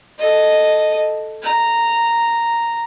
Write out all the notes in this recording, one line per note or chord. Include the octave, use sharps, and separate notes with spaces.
A4 D#5
A#5